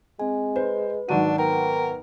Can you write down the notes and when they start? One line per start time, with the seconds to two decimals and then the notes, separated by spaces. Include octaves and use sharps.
0.19 G#3 C4 G#5
0.56 B4 C5
1.09 G#1 F#3 D4 F#4 D#7
1.38 B3 A#4 G5